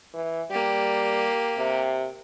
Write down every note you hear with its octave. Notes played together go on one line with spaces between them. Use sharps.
E3
G3 A#3 G4
C3